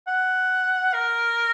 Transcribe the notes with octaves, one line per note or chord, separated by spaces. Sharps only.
F#5
A#4